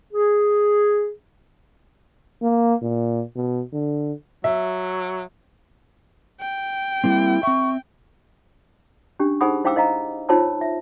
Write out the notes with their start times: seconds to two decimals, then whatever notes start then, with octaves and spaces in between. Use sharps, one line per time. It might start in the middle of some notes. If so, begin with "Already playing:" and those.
0.12 G#4
2.43 A#3
2.82 A#2
3.36 B2
3.73 D3
4.44 F#3 E5
6.40 G5
7.04 G3 A#3 C4 E4
7.43 C4 E5 C#6
9.20 C#4 D4 G4
9.41 D#4 G#4 C5 F#5 B5 D#6
9.64 E4 C5 F5 G5 D6 E6
9.76 C5 D#5 F5 A#5
10.29 D#4 F4 C5 C#5 A5 E6
10.61 E5